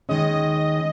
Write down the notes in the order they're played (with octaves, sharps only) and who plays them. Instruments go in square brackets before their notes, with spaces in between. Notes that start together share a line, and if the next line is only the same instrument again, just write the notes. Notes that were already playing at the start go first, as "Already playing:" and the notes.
[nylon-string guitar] D#2 D#3 G#3 C#4 [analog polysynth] D#5